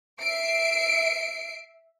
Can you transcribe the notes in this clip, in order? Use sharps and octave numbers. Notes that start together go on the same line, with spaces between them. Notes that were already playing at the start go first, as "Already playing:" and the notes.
E5 C7 D7